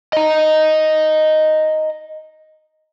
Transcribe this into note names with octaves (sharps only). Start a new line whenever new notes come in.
D#5 A#5